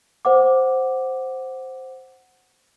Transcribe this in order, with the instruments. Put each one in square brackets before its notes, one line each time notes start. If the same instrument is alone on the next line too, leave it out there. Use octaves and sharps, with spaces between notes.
[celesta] C5 F#5 D6